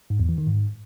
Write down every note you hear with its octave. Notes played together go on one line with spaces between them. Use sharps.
G#2
E2
E3
D#3
G#2